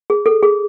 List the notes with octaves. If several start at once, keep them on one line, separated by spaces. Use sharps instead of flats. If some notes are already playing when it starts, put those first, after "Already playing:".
G#4
A4
G#4